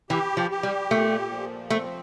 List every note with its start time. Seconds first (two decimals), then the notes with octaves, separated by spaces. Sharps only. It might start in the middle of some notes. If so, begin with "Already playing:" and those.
0.10 E3 G4
0.37 F3
0.51 G4
0.63 G3
0.91 A#2 A3
1.31 F3
1.70 A3 C4